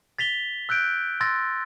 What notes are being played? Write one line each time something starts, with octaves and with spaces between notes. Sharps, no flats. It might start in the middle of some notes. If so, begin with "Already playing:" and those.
A6 B6 F7 G7
E6 F#6 G6 D7
C6 E6 A6 A#6